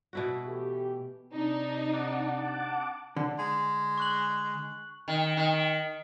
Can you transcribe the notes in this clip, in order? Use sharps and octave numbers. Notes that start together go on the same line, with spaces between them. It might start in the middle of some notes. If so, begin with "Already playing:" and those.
B2 E4 F#4
E3 A3 G4
C3 D4 D#4
F#5 A5 D6
D3
G#3
C#6 F#6 F#7
D#3
D#3